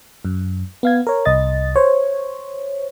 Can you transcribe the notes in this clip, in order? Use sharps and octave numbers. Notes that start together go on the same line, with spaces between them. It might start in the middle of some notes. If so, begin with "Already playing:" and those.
F#2
B3 F5 G#6
A#4 C#5
C2 D#5 A6
C5 C#5